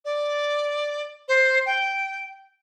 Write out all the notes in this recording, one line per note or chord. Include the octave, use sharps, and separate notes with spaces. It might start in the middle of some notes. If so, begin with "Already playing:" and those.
D5
C5
G5